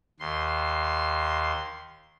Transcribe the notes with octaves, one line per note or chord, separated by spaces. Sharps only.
D#2 C6